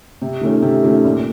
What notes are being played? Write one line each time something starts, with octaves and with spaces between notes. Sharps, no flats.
C3
D#3 A3 C#4 F4
C3
D#3 A3 C#4 F4
A#2